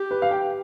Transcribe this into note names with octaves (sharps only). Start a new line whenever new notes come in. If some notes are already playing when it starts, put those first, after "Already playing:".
Already playing: G4
B4
F5
G5